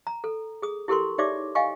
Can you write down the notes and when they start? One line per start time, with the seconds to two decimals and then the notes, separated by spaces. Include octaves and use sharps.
0.07 A#5
0.24 A4
0.62 G#4 D#6
0.88 E4 G4 A4 A#4 C6 C#6
1.18 D#4 G4 C#5 D5 E5 D6
1.55 D#5 F5 G5 G#5 C#6